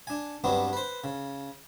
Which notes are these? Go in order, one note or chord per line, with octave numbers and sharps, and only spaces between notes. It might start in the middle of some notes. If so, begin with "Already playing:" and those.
D4 G#5
G2 F#3 B3 C4 D4
B4 C5
C#3